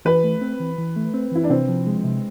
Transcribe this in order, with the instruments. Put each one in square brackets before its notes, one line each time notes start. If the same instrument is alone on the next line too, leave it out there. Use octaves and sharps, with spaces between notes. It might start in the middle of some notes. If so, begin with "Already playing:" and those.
[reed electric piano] E3 [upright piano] B4
[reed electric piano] A3
C4
E3
E3
A3
C4
[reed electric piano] E3 [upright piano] E4
[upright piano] D4
[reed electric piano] C3 [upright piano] C4
[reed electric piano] F3
G#3
C3